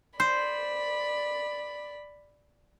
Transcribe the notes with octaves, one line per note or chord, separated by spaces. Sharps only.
C5 D5 B5